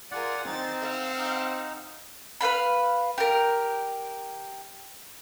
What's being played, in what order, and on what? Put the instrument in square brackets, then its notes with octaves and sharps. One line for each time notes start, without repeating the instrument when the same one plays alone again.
[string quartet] F4 G#4 A#4 [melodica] D5 F#5
[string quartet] D#3 A6 [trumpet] C4 [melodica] D#4
[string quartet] F5 F#5 E6
[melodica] D#4
[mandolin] B4 C5 F5 B5
G4 A#4